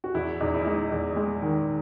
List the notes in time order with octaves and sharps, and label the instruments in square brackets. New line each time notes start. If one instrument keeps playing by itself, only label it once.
[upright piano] F#4
E2 E4
E2 D#4
E4
G#3 D#4
E2
G#3
D#3